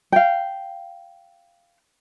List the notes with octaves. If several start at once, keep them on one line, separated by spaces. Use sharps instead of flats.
F5 G5